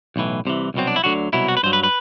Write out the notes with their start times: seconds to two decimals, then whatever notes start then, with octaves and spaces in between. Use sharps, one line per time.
0.16 B1 A2 E3
0.45 C2 C3 E3
0.74 C2 B2 F#3 C4
0.87 D4
0.96 E4
1.04 D2 D3 F#3 F#4
1.33 C2 B2 F#3 E4
1.48 F#4
1.57 B4
1.63 G2 F#3 C5
1.73 B4
1.83 B4